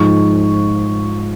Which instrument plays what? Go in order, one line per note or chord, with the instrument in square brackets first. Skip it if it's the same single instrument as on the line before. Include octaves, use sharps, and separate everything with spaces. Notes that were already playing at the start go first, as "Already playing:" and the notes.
Already playing: [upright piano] G#2 F3 C#6